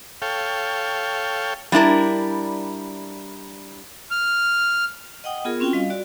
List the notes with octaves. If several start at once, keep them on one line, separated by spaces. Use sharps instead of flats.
A4 C#5 F5 G5
G3 D4 E4 A#4
F6
D#5 F#5 G5 D#6
B3 F4 G#4 A#4
C4 C#4 F4 F#4 G5
G3 D#5 F5
F#4 D5